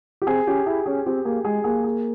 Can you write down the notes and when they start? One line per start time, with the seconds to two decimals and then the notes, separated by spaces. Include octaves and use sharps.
0.22 G4
0.27 C4 G#4
0.47 C#4 G4
0.66 E4 G#4
0.86 C#4 G#4
1.06 C4 G4
1.25 A#3 G#4
1.45 G#3 G#4
1.64 A#3 G#4
1.84 G#4